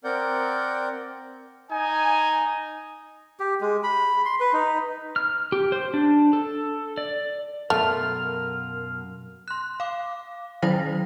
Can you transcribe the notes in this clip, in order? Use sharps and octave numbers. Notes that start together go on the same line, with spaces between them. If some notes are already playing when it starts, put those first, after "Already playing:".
C4 A#4 D5 F#5 G6
D#4 G#5
G4
G#3
B5
C6
B4
D#4
F6
G4
C5
D4
A4
D5
F#2 B2 A3 F4 A#4 F6
C6 F#6
F5 D6
D#3 F#3 E4 C5 G5 A#6